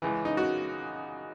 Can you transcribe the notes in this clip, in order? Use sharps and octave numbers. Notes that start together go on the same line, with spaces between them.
C#2 C#3 E3
D#4
F#4